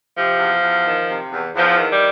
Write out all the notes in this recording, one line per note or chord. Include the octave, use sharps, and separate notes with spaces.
C3 F3
E2
E2
D#3
C3
E2
E2 F3
D#3
G3